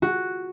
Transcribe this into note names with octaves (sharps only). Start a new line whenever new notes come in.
F#4